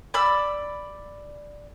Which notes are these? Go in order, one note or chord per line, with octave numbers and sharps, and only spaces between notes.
D5 B5 E6